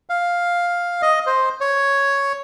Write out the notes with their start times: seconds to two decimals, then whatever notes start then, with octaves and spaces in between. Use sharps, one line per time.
0.10 F5
1.02 D#5
1.26 C5
1.61 C#5